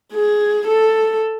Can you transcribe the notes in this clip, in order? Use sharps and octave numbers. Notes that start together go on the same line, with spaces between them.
G#4
A4